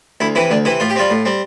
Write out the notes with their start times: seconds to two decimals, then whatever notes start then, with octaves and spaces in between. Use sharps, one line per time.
0.20 D2 E4
0.35 C3 E3 E4
0.50 D2 D4
0.65 C3 E3 E4
0.80 A2 F4
0.90 G4
0.96 G3 C4 F4
1.10 A2
1.25 G3 C4